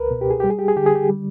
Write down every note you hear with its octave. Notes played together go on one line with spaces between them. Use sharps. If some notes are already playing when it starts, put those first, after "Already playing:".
Already playing: C#2 A#4 B4
B2
G4
G#4
G3 G4
G#4
G4
G#4
D3 G4
G#4
G4
G3